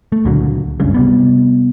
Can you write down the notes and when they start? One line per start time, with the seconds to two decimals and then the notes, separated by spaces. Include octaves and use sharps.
0.12 A3
0.25 C#2 A#2 D3 F#3
0.80 F#1 C#2 G2 C#3
0.94 C3 G3 B3